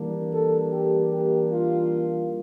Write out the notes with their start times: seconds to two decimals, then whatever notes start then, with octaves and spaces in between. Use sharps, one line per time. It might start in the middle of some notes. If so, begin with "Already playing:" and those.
Already playing: E3 G3 A#3 D4
0.31 A4
0.71 G4
1.11 G4
1.51 F4